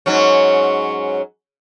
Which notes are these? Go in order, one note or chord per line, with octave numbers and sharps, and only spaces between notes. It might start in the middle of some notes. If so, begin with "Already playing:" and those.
G#2 F#3 C#4